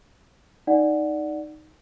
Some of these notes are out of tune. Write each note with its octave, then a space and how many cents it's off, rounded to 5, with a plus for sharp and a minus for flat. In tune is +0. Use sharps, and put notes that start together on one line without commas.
D#4 +0 D5 +0 F#5 +0